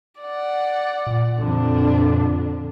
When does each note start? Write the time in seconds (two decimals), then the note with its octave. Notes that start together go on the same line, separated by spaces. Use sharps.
0.21 D5 F#5
1.07 A#2
1.39 F2 D3 D4